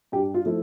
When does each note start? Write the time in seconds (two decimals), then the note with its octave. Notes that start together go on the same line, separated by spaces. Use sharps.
0.12 G2 G4
0.34 F4
0.45 F3 A3 E4